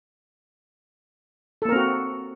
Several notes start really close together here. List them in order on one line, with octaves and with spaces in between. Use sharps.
A4 A#3 A#4 C4 F#4